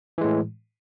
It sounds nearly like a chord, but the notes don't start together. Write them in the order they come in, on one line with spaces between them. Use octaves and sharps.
E3 G#3 A2